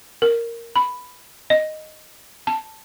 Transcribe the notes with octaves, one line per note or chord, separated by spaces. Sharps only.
A#4
B5
D#5
A5